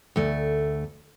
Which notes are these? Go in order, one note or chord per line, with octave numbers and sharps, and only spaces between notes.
D2 A3